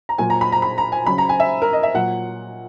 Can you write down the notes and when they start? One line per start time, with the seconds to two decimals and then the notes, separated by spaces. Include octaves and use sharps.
0.09 A#5
0.18 A#2 F#3 G#5
0.30 A#5
0.41 B5
0.52 A#5
0.62 B5
0.78 A#5
0.92 G#5
1.06 C#3 F#3 B5
1.18 A#5
1.29 G#5
1.40 E5
1.62 A#4
1.73 D#5
1.83 E5
1.94 A#2 F#3 F#5